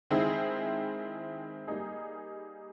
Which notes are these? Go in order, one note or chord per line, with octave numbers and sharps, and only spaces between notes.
D#3 G#3 C4 E4 G#4
G3 A#3 D#4 G#4